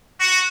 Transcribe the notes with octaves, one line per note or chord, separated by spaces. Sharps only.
F#4